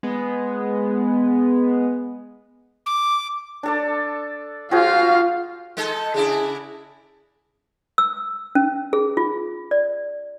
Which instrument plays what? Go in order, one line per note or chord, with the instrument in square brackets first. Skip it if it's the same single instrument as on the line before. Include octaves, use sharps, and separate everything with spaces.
[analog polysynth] G#3 B3
[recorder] D6
[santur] D4 A4 D5
[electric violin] F4 F5 [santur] F#4 G#4 C5
[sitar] G#3 D#4 A4
[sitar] C#3 D4 E4 [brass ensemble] G#4
[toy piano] E6
C#4
G#4
F4
D5